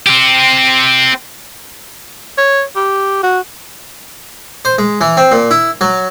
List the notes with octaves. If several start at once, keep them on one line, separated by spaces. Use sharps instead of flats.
C4 G4
C#5
G4
F#4
C5
G#3
E3
C4
A#2
E4
F#3